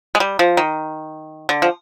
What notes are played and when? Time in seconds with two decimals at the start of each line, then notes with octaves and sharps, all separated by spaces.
0.15 G#3
0.20 G3
0.39 F3
0.57 D#3
1.49 D3
1.62 F3